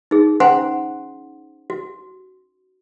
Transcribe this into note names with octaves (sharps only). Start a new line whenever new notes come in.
D#4 G#4
C#4 C5 F#5 G#5 A#5 C6
F#4